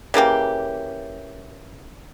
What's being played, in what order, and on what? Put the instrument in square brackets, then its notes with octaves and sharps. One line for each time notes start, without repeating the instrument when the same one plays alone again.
[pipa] C#3 E3 A#3 G4